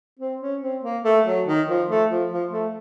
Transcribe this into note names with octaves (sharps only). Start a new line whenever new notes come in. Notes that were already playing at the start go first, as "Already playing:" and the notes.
C4
C#4
C4
A#3
A3
F#3
D#3
F3
A3
F3
F3
A3